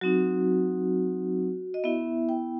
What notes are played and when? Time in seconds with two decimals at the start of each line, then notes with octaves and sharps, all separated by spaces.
0.01 F#3 C4 D#4 F#4
1.74 D#5
1.84 B3 E4 E5
2.29 G5